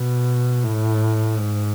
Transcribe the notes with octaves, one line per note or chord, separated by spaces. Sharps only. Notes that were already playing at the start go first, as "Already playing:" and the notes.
Already playing: B2
A2
G#2